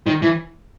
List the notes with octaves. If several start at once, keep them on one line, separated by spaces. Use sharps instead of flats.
D#3
E3